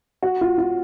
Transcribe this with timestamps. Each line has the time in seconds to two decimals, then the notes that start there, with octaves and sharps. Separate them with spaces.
0.23 F#4
0.41 F4
0.58 F4